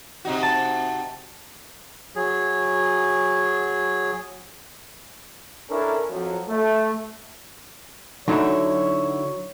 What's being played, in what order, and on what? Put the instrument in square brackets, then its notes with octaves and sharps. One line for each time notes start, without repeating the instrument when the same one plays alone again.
[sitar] C3 D#4 F#4
[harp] A5
[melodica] F#3 G#4
[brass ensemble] C#4 D4 E4 A4 A#4
F2 F3 F#3
A3
[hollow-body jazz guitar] D3 D#4 E4 [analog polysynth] F#3 [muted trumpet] C#5